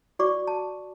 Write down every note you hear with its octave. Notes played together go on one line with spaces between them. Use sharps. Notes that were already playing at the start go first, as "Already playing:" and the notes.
F#4 D5 C#6 D6
A5